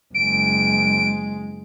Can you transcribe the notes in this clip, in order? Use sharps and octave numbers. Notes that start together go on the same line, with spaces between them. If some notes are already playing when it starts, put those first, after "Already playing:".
F#1 G#3 D7